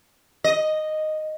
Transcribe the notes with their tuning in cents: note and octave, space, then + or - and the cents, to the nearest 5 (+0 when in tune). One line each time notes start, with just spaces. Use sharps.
D#5 -5